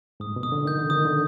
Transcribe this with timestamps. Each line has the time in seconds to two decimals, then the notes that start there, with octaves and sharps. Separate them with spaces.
0.20 G#2 D#6
0.36 B2
0.43 D#6
0.52 D3
0.65 D#3 G6
0.78 D3
0.90 D#3 D#6
1.05 D3